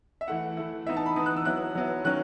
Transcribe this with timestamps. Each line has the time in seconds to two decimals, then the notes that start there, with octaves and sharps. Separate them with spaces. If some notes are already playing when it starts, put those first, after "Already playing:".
0.21 E5
0.28 E3 A3 E4 F#5
0.57 E3 A3 E4
0.87 E3 B3 D#4 E5
0.97 A5
1.06 B5
1.16 E3 B3 D#4 D#6
1.26 F#6
1.36 E6
1.45 F#3 B3 E4 F#6
1.75 F#3 B3 E4
2.04 D#3 F#3 C#4 F#6